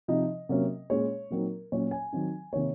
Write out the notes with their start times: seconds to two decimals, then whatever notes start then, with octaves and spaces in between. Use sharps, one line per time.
0.08 C3 F3 C4 D#4 D#5
0.49 C3 F#3 A#3 C#4
0.90 A#2 G#3 C#4 C#5
1.30 A#2 F#3 C4 D#4 A#4
1.72 A#2 F#3 C#4 C#5
1.91 G#5
2.12 D#3 F#3 C4 D#4
2.53 C3 D#3 A#3 C#5